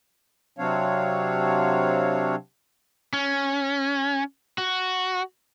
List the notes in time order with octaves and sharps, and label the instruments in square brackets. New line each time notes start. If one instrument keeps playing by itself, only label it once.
[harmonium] C3 F#3 C4 D4 C#5 F5
[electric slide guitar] C#4
F#4